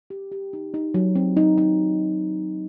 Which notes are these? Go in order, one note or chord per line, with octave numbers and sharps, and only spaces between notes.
G4
G4
D#4
D#4
F#3
C4
D#4
D#4